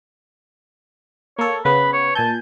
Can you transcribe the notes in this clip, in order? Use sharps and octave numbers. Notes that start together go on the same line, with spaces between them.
A#3 A4 C#5
C#3 B3 B4 B5
C#5
A#2 G#5 A5 G6